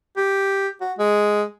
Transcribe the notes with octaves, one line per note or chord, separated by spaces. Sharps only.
G4
F#4
G#3